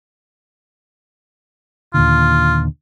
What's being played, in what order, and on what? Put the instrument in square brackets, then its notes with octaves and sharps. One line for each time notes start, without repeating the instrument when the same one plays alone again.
[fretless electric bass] D#2 A#2 D3 [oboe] F4